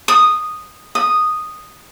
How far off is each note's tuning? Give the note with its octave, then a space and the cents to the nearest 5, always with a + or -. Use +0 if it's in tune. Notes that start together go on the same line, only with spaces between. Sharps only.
D#6 -10
D#6 -5